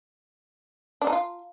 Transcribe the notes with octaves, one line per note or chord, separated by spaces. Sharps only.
D4
D#4
F4